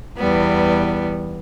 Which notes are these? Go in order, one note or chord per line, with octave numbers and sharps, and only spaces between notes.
E2 G3 B3